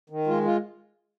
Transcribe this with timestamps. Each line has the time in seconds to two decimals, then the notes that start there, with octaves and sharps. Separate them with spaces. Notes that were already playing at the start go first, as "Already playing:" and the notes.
0.10 D#3
0.27 G#3 F4
0.45 F4